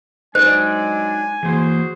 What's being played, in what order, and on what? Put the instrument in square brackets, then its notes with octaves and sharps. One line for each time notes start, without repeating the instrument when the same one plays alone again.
[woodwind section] F#3 G#3 D4 [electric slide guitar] D#4 D5 [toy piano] C5 [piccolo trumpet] G#5
[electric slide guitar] E3 A#3 [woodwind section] F#4 G#4 C5